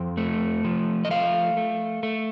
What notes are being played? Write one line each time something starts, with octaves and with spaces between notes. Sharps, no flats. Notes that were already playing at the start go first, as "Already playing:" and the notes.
Already playing: F2 G5
A3
F3
D#5
A3 F5
A3
A3